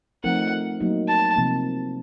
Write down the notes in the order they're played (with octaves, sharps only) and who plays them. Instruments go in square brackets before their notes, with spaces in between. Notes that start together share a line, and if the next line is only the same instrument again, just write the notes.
[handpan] F3 A3 C4 D#4 A#4 [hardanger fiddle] F#5
[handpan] F#3 A#3 D#4
[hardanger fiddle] A5
[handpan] C3 F3 A#3